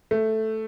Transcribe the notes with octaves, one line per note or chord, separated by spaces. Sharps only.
A3